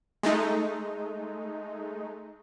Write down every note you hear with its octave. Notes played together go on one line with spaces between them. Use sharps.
G#3 A3 D#4